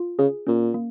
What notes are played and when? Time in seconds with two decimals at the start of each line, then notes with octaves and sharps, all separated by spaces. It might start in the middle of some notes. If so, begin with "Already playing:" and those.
Already playing: F4
0.18 C#3 G#4
0.47 A#2 C#4
0.74 A#3